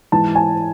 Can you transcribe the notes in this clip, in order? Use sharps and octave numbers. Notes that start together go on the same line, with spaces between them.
G#2 E3 A5
G#5